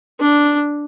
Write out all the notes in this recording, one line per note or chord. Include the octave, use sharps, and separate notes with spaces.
D4